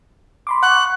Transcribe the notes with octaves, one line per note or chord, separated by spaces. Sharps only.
B5 C6 D6
F#5 C#6 F#6